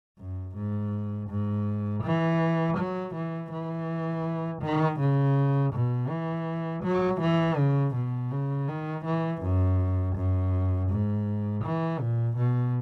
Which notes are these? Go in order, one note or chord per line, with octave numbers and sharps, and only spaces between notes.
F#2
G#2
G#2
E3
F#3
E3
E3
D#3
C#3
B2
E3
F#3
E3
C#3
B2
C#3
D#3
E3
F#2
F#2
G#2
E3
A#2
B2